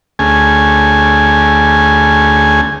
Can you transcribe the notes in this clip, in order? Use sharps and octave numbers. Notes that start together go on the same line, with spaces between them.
D2 A3 C#4 G#4 G#5